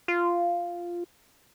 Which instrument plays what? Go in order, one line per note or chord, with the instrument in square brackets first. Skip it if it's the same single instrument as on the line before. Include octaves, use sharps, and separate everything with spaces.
[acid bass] F4